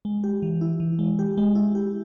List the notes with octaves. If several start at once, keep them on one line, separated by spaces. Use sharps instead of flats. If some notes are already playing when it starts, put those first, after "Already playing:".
G#3
G4
E3
E4
E3
G#3
G4
G#3
E4
G4